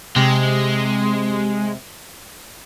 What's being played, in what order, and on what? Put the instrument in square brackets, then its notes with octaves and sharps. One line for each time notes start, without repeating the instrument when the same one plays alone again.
[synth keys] C3 [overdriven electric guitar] G#3